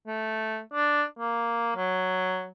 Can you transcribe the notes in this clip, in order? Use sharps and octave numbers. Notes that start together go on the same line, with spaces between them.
A3
D4
A#3
F#3